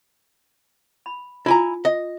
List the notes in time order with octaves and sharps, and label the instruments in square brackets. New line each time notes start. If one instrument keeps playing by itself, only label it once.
[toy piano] B5
[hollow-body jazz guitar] E4 G#5 A#5 [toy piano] F4
[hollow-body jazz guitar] D#5